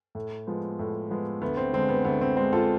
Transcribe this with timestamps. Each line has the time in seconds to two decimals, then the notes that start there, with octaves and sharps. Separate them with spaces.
0.15 A2
0.47 F3 G#3 B3
0.79 A2
1.10 F3 G#3 B3
1.41 D2 B3
1.57 C4
1.73 D3 G#3 C4
1.89 B3
2.05 D2 B3
2.21 C4
2.36 D3 G#3 C4
2.53 F4 A4